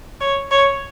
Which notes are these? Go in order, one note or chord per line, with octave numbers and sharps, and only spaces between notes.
C#5
C#5